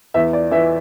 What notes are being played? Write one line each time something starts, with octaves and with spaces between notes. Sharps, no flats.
E2 E5
D5
E3 E5